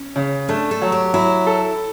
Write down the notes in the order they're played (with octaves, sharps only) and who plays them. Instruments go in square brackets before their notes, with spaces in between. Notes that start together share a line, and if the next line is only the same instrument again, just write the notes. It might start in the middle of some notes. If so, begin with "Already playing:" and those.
Already playing: [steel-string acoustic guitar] C#4
[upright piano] C#3
[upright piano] A3 [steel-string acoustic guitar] D4
[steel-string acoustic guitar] A4
[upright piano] F#3
[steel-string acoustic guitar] G4
[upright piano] F#3 [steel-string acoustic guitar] E4
[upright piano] A4